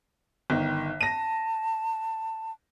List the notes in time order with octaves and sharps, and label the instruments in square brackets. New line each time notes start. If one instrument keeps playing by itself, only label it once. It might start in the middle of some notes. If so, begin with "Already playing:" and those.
[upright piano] G1 D#3
[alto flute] A5 [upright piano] A#6 D#7